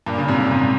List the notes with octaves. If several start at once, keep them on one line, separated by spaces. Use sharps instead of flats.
G2 A#2
C#3
G#2 C3
G#2 C3